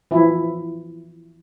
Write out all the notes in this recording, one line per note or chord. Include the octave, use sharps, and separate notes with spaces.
E3 F3 E4